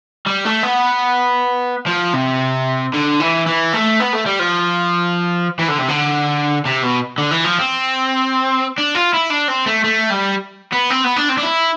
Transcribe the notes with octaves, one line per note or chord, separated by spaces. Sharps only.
G3
A3
B3
F3
C3
D3
E3
E3
A3
B3
A3
G3
F3
E3
D3
C3
D3
C3
B2
D3
E3
F3
C4
D4
F4
E4
D4
C4
A3
A3
G3
B3
C4
B3
D4
C4
D4
E4